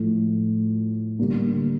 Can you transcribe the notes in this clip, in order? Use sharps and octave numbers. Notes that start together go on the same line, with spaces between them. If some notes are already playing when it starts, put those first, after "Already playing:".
Already playing: A2 F3 A3
D3 G3 A#3